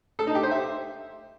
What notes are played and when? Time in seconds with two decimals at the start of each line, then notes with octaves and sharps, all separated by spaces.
0.19 A4
0.27 D#4
0.35 G4
0.43 C5
0.51 E5